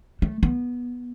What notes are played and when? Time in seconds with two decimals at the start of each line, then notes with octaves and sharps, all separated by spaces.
0.22 A3
0.43 B3